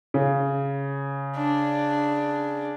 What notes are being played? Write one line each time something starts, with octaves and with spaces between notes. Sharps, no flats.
C#3
D4